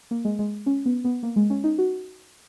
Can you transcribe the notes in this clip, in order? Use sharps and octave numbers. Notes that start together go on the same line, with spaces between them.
A#3
G#3
G#3
C#4
B3
B3
A#3
G#3
C#4
D#4
F#4